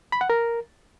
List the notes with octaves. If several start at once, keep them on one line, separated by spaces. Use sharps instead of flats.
B5
F#5
A#4